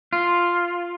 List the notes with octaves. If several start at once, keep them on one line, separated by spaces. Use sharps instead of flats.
F4